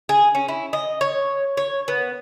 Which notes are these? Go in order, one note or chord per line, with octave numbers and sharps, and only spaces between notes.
G#4
C#4
E4
D#5
C#5
C#5
B3